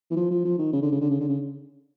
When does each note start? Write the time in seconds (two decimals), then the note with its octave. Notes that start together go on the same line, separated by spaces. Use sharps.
0.11 E3
0.16 F3
0.31 F3
0.45 F3
0.58 D#3
0.73 C#3
0.82 D3
0.91 C#3
1.01 D3
1.10 C#3
1.20 D3
1.29 C#3